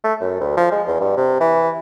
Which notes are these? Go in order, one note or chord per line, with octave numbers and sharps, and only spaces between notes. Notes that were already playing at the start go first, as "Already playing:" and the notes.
A3
F#2
D2
F3
G#3
E2
G2
C3
E3